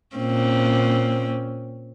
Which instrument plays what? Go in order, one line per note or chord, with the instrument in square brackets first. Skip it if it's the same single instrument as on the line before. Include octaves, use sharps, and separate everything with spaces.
[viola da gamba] A#2 C4 C#4